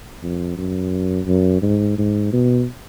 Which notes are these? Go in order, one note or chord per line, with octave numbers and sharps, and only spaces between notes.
F2
F#2
F#2
G#2
G#2
B2